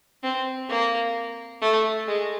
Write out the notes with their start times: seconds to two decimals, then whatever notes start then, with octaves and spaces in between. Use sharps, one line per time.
0.23 C4
0.69 A#3
1.62 A3
2.08 G#3